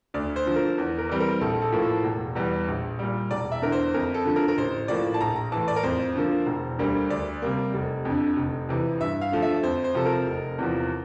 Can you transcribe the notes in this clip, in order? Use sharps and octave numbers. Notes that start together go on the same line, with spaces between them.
D2 D5
C5
D3 F3
A#4
E2
A#4
E3 G3 C4
A#4
A#1 A4
A4
A2 F3 A#3
A4
E1
E2 E3 G3
A#1
A#2 G3
E1 D5
E5
E2 D3 A#4
C5
F2 A#4
A4
D3 F3
A#4
A#4
A1 C5
A2 F3 A#3 D5
A5
A#1 A#5
A#5
A2 E3 A5
D5
A#4
F2 C5
D3 F3 A#3
E1
D2 D3 G3 A#3
D2 D5
C3 G3 A#3
F1
F2 D3
F1
F2 C3 E3
G2 E5
F5
D3 F3 A3
E5
F2 C5
C5
C3 F3 A4
A#4
F1
E2 C3 F3